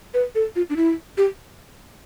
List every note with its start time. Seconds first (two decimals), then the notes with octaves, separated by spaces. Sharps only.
0.14 B4
0.35 A4
0.56 F4
0.70 D4
0.76 E4
1.18 G4